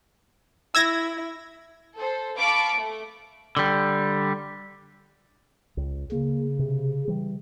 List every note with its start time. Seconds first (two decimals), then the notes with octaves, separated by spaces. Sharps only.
0.75 E4 E6 G#6 A#6
1.96 A4 C5
2.36 F5 A5 B5 C#6 D6
2.73 A3
3.57 D3 G3
5.77 C#2
6.12 C#3 A#3
6.59 C3
7.08 E3 G3